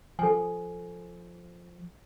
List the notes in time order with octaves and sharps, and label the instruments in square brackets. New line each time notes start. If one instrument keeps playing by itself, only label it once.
[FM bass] F3 [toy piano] A4 G#5